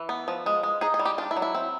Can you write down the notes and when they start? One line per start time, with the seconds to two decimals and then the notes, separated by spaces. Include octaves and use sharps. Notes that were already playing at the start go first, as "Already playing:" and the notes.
Already playing: E3
0.09 B3
0.28 F3
0.46 G#3
0.63 G#3
0.81 D#4 G#4
0.94 G#4
0.99 G3
1.06 G4
1.18 D4 F4
1.31 E4
1.37 F#3
1.42 E4
1.55 C4